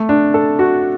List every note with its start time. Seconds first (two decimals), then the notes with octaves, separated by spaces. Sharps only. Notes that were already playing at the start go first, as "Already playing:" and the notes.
Already playing: A3
0.09 D4
0.34 A4
0.59 F#4